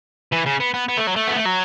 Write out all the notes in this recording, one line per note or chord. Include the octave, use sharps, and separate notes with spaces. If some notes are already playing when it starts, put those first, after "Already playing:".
E3
C#3
B3
B3
B3
A3
F#3
A3
B3
A3
F#3